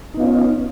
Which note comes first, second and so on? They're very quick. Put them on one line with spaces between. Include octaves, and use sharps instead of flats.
D#4 B3 F4 C#4